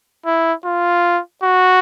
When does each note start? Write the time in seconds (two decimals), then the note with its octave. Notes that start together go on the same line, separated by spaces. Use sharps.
0.26 E4
0.65 F4
1.43 F#4